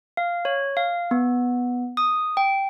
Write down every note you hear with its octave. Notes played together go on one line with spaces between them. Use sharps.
F5
C#5
F5
B3
D#6
G5